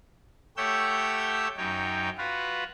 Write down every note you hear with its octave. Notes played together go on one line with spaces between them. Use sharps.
A3 G4 C#5 F#5 E6 G6
F#2 D#4 C#5 G5
F4 F#4 B4